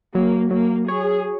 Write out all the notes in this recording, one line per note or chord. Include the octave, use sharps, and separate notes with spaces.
F#3 A#3
F#3 A#3
G#4 C#5